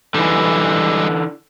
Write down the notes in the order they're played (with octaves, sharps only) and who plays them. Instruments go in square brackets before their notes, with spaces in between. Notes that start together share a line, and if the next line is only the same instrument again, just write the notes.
[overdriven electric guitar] D3 E3 [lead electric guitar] G3 G#3